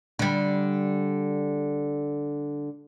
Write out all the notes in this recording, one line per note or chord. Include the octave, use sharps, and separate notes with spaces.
D3 G3